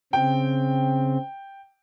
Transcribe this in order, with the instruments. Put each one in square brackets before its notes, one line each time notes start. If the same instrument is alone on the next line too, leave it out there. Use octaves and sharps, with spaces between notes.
[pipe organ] C#3 C4 [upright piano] G5